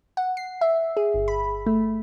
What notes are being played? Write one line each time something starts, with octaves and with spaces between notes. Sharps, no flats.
F#5
C7
E5
G#4
G1
B5
A3